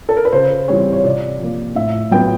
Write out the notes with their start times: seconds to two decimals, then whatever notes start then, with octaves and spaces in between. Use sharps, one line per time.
0.09 A4
0.17 A#4
0.25 B4
0.32 C#3 C5
0.68 E3 G3 C4 C#5
0.93 C#5
1.04 C3 D5
1.39 F3 A#3
1.75 A2 E5
2.11 F#3 B3 G5